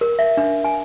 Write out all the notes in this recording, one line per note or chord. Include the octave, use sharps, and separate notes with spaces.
A#4
E5
D4
G#5